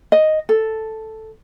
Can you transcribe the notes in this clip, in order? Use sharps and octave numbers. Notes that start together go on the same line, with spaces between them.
D#5
A4